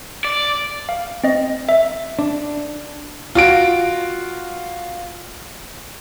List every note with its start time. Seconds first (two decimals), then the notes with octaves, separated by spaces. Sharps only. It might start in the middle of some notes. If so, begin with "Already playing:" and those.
0.25 D5
0.89 F5
1.24 C4 D#5
1.69 E5
2.19 D4
3.35 F4 F#4 D7